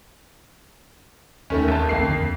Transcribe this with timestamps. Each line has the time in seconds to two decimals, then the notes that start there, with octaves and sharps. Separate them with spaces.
1.50 D#2 D#3 A3 C#4
1.68 G#1 A5
1.89 A#1 F2 A3 A#3 C7
2.02 A1 D3 D4
2.17 D#2